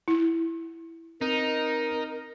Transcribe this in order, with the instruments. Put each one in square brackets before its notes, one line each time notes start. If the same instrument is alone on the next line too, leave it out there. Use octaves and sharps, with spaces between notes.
[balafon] E4
[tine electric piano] C4 [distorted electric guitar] D#4 [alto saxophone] A#4